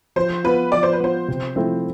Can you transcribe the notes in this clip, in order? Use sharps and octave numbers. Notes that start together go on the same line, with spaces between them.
F3 C5
B3 F4 B4
F3 D5
C5
B4
B3 F4 C5
C3
F3 A3 C4 E4